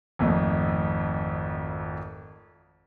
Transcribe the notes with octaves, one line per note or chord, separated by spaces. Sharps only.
G#1 F2 A3 D#4